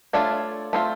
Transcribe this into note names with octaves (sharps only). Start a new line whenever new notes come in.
A3 D4 F4 A4 C#5
A3 C4 F4